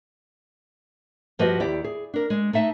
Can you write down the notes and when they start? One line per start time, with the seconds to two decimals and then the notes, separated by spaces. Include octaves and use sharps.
1.39 G2 F3 F#4 G4 B4 D#5
1.60 D#2 E4 G4 D5
1.84 G#4
2.14 D4 A#4
2.30 G#3
2.53 A3 D#4 E5 A5